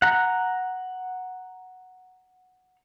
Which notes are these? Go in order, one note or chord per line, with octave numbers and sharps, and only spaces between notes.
F#5 A#5